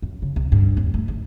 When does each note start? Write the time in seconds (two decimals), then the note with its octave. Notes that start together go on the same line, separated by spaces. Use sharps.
0.02 F#2
0.22 C#3
0.36 C2
0.52 G2
0.77 D#2
0.94 A3
1.08 G#2